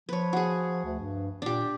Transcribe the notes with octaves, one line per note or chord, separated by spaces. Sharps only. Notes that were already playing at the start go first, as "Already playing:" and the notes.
F3 B4 C#5
F#4 G#4
D2
G2
A#2 D4 G4